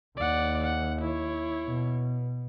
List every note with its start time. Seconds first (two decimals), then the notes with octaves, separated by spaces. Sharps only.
0.17 D#2 D5 F#5
0.64 F#5
1.01 E4 C#5
1.66 B2